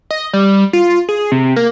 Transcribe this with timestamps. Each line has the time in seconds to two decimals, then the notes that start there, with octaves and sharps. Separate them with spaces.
0.11 D#5
0.33 G3
0.73 F4
1.09 G#4
1.32 C3
1.56 A#3